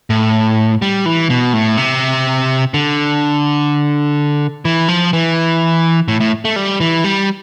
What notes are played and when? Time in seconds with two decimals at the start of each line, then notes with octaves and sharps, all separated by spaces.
0.10 A2
0.82 G3
1.06 E3
1.30 B2
1.54 A2
1.77 C3
2.74 D3
4.65 E3
4.88 F3
5.13 E3
6.08 A2
6.20 A2
6.45 A3
6.56 G3
6.80 E3
7.04 G3